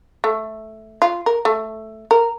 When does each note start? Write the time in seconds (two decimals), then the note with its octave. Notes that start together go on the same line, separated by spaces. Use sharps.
0.24 A3
1.02 F4
1.26 A#4
1.45 A3
2.11 A#4